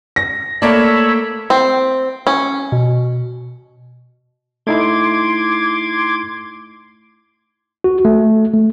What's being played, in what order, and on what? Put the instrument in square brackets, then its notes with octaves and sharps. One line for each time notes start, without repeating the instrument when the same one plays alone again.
[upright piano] A#6
[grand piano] A3 A#3 [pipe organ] C#5 B5 E6 [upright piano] D5
[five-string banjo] C4
C#4
[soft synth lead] B2
[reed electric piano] A3 D#4 E4 [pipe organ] C6 D6 G#6
[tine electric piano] F#4
A3
A3